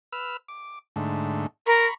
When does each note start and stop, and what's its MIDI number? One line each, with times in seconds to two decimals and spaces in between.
0.12 0.37 71
0.12 0.37 88
0.12 0.37 89
0.48 0.79 86
0.96 1.47 44
0.96 1.47 50
0.96 1.47 57
1.66 1.86 70
1.66 1.94 82
1.66 1.94 83
1.66 1.94 85